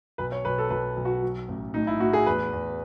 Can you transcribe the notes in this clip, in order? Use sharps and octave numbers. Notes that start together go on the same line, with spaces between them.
B1 B4
C#5
B1 B4
A4
B1 B4
B1
F#4
F#3
A1
A2 D#4
E4
A2 F#4
G#4
E2 B4
E2